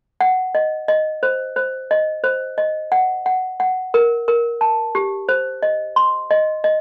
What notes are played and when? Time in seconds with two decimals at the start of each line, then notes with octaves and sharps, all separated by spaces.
0.21 F#5
0.55 D#5
0.88 D#5
1.23 C5
1.56 C5
1.91 D#5
2.24 C5
2.58 D#5
2.92 F#5
3.26 F#5
3.60 F#5
3.94 A#4
4.28 A#4
4.61 A5
4.95 G4
5.29 C5
5.63 D#5
5.96 C6
6.31 D#5
6.64 D#5